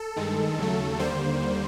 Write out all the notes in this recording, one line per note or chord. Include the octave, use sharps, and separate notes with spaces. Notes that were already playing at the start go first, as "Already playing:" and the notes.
Already playing: A4
G2 D#3 G#3
D#2 C#3 F#3 A3
D#2 D3 G3 A#3 C5